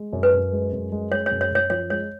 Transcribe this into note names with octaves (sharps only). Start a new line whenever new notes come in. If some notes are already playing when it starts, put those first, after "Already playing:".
Already playing: G#3
F#2
B4
F#2
G#3
F#2
G#3
G#3 C#5
C#5
F#2
C#5
F#2 C#5
F3 C#5
G#3 C#5